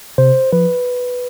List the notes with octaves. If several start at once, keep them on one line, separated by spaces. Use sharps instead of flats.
C3 C5
F3 B4